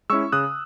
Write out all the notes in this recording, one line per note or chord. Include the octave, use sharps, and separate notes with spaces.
G#3 C#4 E4 C#6 E6
C#3 D#6 F#6